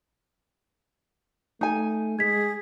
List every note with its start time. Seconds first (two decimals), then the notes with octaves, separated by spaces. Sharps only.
1.61 A3 D#4 G#5
2.19 G#3 G#4 G#6 B6